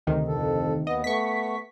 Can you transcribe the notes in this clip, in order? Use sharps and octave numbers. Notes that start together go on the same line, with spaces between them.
D2 C3 D#3
F2 A4
D#2 B3 D#5
A3 B3 C#6 B6